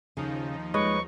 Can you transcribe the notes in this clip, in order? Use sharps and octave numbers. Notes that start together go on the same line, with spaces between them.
D#2 C#3 F3 D#4
G#3 B4 C#5 D#5 C#6